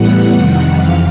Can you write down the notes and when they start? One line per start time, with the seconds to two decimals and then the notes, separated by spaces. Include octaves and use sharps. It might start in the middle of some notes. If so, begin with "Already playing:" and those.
Already playing: A2 E3 G3 B3 F#5
0.33 F2 C3 D#3 G3
0.77 F2 C3 E3 F5